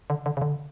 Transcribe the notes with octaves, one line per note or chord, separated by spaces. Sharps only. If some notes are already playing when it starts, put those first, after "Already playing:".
D3
D3
C#3
D3